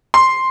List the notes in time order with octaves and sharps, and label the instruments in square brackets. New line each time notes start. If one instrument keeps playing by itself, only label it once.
[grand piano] C6